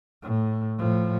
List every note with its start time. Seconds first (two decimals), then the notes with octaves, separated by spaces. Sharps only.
0.22 A2
0.78 A2 F3